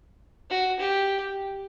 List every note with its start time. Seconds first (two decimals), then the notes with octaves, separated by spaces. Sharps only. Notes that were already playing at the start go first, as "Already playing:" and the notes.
0.50 F#4
0.80 G4